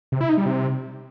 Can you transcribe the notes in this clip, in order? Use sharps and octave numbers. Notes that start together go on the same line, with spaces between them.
C3
E4
D#4
G3
C3